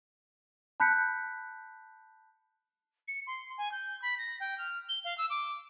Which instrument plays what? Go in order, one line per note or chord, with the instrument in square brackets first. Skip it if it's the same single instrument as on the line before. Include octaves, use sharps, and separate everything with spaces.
[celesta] A5 B5 F#6 G6 B6 C#7
[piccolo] C#7
C6
G#5
G6
B5
A#6
G5
F6
G7
F5
E6
D6